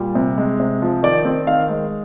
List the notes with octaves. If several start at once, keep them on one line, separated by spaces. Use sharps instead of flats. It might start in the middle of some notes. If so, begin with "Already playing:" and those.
Already playing: A#2 G3
C3
G#3
C3
F3
D#3 D5
C4
D#3 F5
G#3